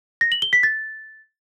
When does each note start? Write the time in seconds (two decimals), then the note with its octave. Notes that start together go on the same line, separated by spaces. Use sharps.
0.21 A#6
0.32 F#7
0.42 G7
0.53 B6
0.63 A6